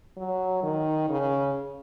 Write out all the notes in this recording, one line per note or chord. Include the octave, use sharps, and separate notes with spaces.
F#3
D#3
C#3